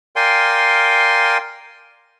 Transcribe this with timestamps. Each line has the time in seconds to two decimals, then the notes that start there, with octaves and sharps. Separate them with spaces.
0.16 A#4 D5 F5 G5 G#5 C6